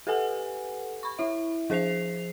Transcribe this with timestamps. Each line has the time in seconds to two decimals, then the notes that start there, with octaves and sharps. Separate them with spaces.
0.07 G4 A4 B4 F#5 G#5
1.03 B5 C#6
1.19 E4 E5
1.70 F3 G#4 C5 C7 F7